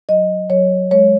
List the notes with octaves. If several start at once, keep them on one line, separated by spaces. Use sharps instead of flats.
F#3 D#5
F#3 C#5
G#3 C#5